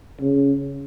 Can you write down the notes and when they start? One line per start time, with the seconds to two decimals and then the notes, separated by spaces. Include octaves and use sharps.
0.21 C#3